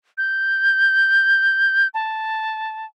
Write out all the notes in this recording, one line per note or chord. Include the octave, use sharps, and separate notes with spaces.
G6
A5